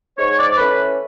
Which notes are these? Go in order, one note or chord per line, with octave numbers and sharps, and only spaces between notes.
G#2 C#5
D5
E3 A3 C#4 B4